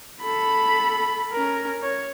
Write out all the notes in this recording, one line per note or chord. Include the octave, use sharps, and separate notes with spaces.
A4 B5
C#4 A#4
C#5